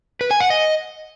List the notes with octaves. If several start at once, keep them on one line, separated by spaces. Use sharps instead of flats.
B4
G#5
F#5
D#5